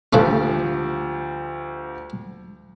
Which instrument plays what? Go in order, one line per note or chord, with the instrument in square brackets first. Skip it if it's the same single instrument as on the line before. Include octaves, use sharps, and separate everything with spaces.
[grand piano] D2 F3 G3 [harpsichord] E3 A3 F4